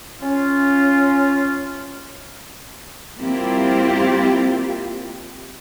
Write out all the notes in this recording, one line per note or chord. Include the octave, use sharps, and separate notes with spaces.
C#4 F4
G3 A#3 C4 E4 F4 G4